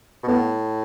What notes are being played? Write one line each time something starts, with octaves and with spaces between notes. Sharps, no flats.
B2
A2 B3